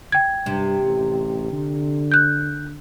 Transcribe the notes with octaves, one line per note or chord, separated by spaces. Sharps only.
G5 G#6
G2 C3
A1
D3
F#6 G6